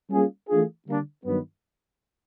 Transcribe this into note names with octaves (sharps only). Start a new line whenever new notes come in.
G3 A#3 C#4 F4 G#4
E3 A3 D4 F4 G#4
D3 G3 A#3 D4
G2 D#3 F#3 B3